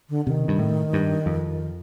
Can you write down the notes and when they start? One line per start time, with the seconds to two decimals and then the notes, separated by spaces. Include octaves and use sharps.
0.09 D3
0.26 C3 D#3
0.48 G2
0.59 A2
0.93 G2
1.26 F2